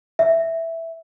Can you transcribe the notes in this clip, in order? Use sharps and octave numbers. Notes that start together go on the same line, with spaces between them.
E5